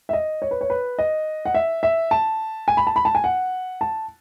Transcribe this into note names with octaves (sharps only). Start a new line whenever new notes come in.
E5
D#5
C#5
B4
C#5
B4
D#5
F#5
E5
E5
A5
G#5
B5
A5
B5
A5
G#5
F#5
A5